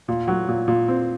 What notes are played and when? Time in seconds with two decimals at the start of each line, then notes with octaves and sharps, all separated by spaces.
0.08 A#2
0.28 F#3
0.48 A#2
0.68 A#2
0.88 C4